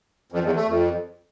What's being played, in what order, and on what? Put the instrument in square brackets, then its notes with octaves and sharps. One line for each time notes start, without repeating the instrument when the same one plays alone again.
[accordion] F2
E2
A3
F2